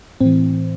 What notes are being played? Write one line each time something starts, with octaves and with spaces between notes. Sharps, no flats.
A2 E3 C4